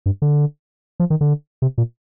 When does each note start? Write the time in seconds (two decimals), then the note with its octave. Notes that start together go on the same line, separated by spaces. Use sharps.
0.06 G2
0.22 D3
1.00 F3
1.10 D#3
1.21 D3
1.62 C3
1.78 A#2